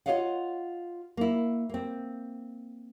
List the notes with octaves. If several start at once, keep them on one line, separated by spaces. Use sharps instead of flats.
F4 G#4 C#5 D#5 F5 F#5
A#3 E4
A#3 C4